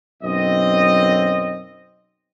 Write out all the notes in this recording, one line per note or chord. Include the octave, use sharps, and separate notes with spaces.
B1 F#2 C4 D#5